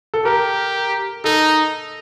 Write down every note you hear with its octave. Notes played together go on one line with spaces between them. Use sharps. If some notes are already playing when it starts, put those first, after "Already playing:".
A4
G4 A#4
D#4 A4